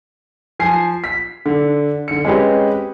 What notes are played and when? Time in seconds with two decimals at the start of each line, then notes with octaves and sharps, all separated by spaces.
0.59 F3 G#5 C7
1.04 B6
1.46 D3
2.08 D3 C#7
2.25 G#3 C4 C#4 G4 B4 D#5